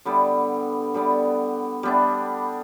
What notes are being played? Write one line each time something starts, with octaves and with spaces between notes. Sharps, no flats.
D3 G3 B3
D3 G3 B3
G3 B3 D4